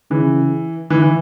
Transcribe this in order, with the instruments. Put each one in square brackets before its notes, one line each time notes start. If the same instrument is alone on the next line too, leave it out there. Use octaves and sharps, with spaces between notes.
[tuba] C#3 [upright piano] E3
[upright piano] E3
E3